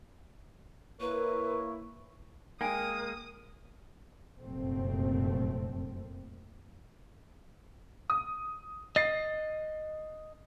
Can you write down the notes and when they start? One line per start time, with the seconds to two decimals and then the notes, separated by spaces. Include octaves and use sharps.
1.00 A#3 E4 A#4 B4 C#5
2.61 G#3 A#3 A#4 G5 G#5 D#6 D7
4.39 F1 F#2 A#2 A3 C4
8.10 D#6
8.96 D#5 A6 C7